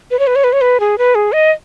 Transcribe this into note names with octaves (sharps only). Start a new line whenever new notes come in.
B4
C#5
B4
C#5
B4
C#5
B4
G#4
B4
G#4
D#5